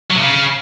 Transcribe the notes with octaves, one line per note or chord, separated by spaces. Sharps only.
F#3
C3
C#3